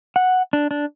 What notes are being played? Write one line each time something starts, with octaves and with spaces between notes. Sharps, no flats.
F#5
D4
D4